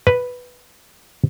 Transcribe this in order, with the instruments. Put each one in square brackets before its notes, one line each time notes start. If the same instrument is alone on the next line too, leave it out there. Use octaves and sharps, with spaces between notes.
[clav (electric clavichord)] B4